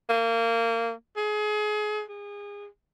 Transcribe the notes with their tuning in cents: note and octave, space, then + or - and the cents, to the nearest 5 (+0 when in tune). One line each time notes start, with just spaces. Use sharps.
A#3 -25
G#4 +30
G#4 -30